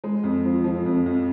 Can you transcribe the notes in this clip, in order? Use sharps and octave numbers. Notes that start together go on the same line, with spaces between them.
G#3
F2
F3
F3
F2
F2